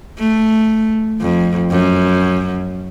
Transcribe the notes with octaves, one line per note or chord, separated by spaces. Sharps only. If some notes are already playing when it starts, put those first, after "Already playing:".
A3
F2
F#2